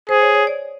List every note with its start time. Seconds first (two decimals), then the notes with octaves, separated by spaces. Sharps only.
0.09 G#4 C5
0.22 C#5
0.35 C#5
0.47 D5